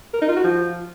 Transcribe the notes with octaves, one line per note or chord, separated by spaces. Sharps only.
A#4
D#4
F4
F#4
F3